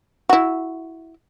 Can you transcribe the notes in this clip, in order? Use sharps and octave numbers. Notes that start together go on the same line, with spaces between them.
E4 F#4